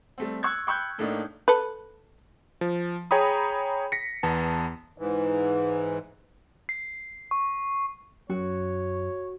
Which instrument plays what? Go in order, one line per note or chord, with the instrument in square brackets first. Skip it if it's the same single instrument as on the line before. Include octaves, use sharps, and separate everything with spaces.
[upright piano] G3 A3 C4
C#6 E6 F#6 G#6
G5 B5 C#6 E6 F#6 G6
A2 A3 A#3 D4 D#4
[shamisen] A4 B4
[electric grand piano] F3
G#4 C#5 G5 A#5 B5 D#6
A#6 B6 C#7
E2 B3 A5
[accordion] G#2 E3
[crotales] C7
C#6
[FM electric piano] F#2 [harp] F#4 [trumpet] C#5